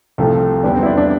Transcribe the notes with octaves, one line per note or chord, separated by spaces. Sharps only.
C2 C3 F3 A3
E2 D3 G3 D4
C4
E4
D4
D4